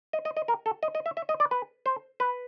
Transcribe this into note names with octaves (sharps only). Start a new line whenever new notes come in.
D#5
D#5
D#5
A#4
A4
D#5
D#5
E5
E5
D#5
D5
B4
C5
B4